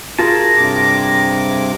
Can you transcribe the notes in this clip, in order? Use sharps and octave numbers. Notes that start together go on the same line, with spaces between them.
F4 F#4 G#4 A#4 A5
G2 C3 D6